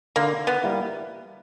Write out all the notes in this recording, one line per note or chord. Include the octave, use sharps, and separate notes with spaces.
D3 A#3
B3
G3 A#3 E4